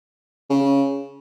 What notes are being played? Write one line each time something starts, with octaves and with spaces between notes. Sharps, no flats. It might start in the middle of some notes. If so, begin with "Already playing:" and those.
C#3